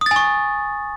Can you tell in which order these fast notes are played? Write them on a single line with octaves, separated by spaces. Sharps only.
D#6 A6 G#5 C#6